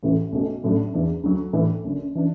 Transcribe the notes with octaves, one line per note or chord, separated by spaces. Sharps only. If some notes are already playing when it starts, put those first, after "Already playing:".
A1 A2 E3 A3
B1 B2 A3
A1 A2 F#3 A3 D4
E2 E3 D4
D2 D3 F#3
A2 E3 D4
F#1 F#2 D3
E3 D4